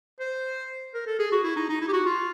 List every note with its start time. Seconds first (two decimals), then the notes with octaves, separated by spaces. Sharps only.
0.20 C5
0.94 A#4
1.07 A4
1.19 G#4
1.32 F#4
1.44 E4
1.56 D#4
1.69 D#4
1.81 E4
1.88 G4
1.93 F#4
2.06 F4